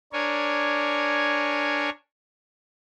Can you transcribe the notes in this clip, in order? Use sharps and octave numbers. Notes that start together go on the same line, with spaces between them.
D4 A#4 C#5 G#5